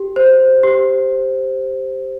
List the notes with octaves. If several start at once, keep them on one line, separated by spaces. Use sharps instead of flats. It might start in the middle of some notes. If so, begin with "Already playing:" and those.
Already playing: G4
C5
G4